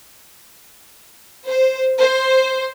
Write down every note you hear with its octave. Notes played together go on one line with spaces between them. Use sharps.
C5
C5